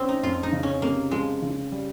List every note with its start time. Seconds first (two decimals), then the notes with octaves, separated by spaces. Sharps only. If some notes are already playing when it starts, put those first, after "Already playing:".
Already playing: C4 C#4
0.09 D#4
0.23 F2 F4
0.43 D#4
0.53 C#3
0.63 C#4
0.82 C3 A#3
1.11 F3 G#3
1.42 C#3
1.71 G3